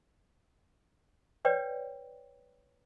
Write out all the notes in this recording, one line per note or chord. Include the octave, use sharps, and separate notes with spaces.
B4 C#5 D5 G5